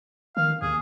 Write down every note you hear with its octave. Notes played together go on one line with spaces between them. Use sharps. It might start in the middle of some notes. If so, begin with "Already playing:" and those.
D#3 F5
D#2 G#4